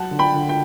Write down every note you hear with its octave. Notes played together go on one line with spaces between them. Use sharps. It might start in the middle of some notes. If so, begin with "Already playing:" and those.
Already playing: F#3 F#5 A5
D3
G5 B5
D3
G5